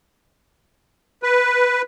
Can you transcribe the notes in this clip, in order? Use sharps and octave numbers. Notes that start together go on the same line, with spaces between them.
B4